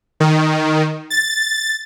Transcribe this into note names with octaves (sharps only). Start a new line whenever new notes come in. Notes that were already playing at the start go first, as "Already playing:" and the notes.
D#3
A6